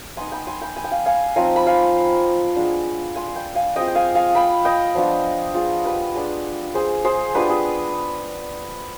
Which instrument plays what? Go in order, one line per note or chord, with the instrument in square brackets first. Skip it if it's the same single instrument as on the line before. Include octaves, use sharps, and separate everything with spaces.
[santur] B3 D#4 G#5 C6
G5 B5
G#5 C6
G5 B5
G#5
G5
F5 G#5
F5 G#5
F3 C4 D#4 F5 G#5
B5
F5 G#5
G#3 B3 D4 F4
G#5 C6
C6
G5 B5
F5 G#5
G#3 C4 F4 D#5 G5
G5
F5 G#5
F5 G#5
G5 B5
D#5 G5
F3 B3 D4 F4
F4 G#4
G4 B4
G#3 B3 D4
G#4 C5
G#4 C5
B3 D4 F4 G4 B4
G#4